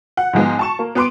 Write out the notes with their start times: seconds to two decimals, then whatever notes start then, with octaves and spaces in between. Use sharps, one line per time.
0.17 F#5
0.33 G#2 F3 G#3 B3
0.59 A5 C#6 E7
0.79 A#3
0.95 B3 B4 C6 D6 D7